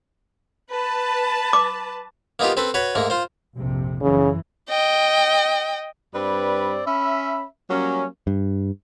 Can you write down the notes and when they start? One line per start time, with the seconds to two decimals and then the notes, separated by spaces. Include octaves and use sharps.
0.72 B4 A5
1.53 D6
2.39 A#3 B3 D#4 F4 G4
2.57 C4 A4 B4
2.74 F#4 B4 C#5
2.95 G#2 A3 A#3
3.10 F4 C5
3.56 A#1 F2 C3
4.02 F#2 C#3 E3
4.69 D#5 G5
6.15 G2 G3 C4 B4 D5 B5
6.86 C#4 E5 B5
7.70 F#3 G3 A#3 C#4
8.27 G2